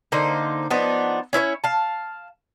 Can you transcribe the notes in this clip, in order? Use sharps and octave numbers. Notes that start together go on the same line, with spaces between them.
D3 A#3 D#4 C5
F3 B3 D4 D#4
C#4 E4 B4 C#5
F5 A5